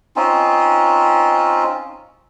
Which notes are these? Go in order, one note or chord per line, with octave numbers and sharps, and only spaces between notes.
C4 C#4 D#4 F4